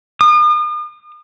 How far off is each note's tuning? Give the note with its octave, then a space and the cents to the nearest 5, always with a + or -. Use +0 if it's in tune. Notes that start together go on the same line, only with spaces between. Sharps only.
D#6 -40